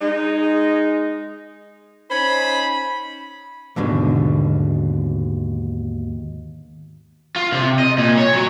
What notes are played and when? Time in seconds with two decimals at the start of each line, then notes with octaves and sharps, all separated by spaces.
0.01 G#3 D#4
2.09 C#4 D#4 C5 B5
3.76 D#2 G#2 B2 D3
7.36 F4
7.52 C3
7.79 D#5
7.98 A#2
8.18 C#5
8.34 F#3